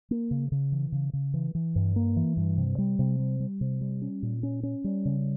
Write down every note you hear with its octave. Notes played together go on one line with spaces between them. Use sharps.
A#3
C#3
C#3
E3
C#3
C#3
E3
E3
G2
A#3
E3
G2
C3
G3
C3
G3
G3
C3
G3
C#4
A#2
C#4
C#4
G3
C#3